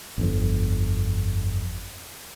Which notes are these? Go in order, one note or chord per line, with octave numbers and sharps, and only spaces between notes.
G1 F2